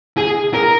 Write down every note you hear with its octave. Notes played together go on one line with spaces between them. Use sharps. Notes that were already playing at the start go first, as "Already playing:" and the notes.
G#4
A#4